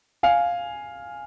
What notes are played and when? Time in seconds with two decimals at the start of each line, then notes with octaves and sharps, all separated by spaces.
0.23 F5 G#5